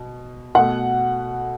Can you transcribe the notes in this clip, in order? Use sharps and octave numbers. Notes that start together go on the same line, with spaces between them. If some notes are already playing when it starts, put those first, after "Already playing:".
Already playing: B2
B2 A3 F#5